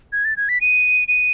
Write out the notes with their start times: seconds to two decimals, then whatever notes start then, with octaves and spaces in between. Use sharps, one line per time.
0.12 G#6
0.25 A6
0.37 G#6
0.49 B6
0.61 D#7
1.08 D#7